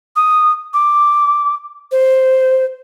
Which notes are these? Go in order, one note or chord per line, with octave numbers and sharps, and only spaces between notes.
D#6
D6
C5